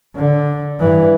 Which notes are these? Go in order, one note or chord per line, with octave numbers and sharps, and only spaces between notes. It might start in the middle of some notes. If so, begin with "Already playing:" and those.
D3
G2 E3